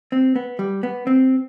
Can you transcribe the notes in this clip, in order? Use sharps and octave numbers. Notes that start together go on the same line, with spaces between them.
C4
B3
G3
B3
C4